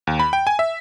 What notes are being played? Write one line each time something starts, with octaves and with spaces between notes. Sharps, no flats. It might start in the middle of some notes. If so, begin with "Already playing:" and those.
D#2
B5
G5
G#5
E5